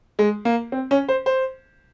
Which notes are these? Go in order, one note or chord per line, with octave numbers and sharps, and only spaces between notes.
G#3
A#3
C4
C#4
C5
C5